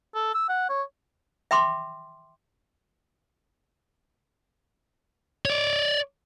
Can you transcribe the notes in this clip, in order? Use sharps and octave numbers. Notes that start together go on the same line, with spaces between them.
A4
E6
F#5
C#5
E5 G5 B5 C6 D6
C#5 D5